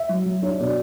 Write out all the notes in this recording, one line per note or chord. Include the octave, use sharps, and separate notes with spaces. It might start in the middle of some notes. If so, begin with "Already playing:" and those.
Already playing: E5
F#3
F#3
D4 C#5
B2 D5